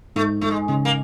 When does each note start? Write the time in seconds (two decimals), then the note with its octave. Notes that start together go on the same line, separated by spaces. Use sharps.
0.16 G#2 A3
0.41 G#2 A3
0.51 G#3
0.68 C#3 G#3
0.85 A#3